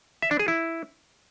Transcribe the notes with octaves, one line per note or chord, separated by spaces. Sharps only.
E5
D4
G#4
E4